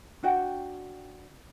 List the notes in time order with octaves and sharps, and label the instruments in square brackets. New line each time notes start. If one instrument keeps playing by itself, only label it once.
[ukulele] D4 F#4 G5